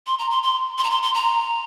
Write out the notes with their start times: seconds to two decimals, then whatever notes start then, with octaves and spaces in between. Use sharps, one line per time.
0.07 C6
0.19 A#5
0.31 C6
0.43 C6
0.78 C6
0.84 A#5
0.90 C6
1.03 C6
1.14 A#5